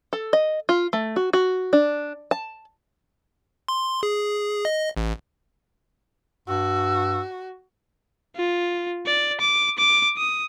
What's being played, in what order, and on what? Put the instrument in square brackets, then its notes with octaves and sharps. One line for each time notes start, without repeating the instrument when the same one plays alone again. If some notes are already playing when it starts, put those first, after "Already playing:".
[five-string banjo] A4
D#5
F4
A3
F#4
F#4
D4
A5
[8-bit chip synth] C6
G#4
D#5
A1
[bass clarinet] G2 [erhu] F#4 [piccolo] E6
[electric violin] F4
D5
D6
D6
D#6